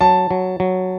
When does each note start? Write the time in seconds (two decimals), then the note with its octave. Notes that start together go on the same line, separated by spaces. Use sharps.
0.01 F#3 A5
0.31 F#3
0.60 F#3